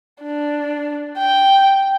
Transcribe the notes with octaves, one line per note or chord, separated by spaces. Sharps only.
D4
G5